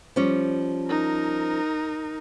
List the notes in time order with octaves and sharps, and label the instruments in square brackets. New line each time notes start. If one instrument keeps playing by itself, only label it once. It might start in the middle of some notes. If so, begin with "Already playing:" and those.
[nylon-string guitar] F3 G3 C#4
[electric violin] D#4 A#4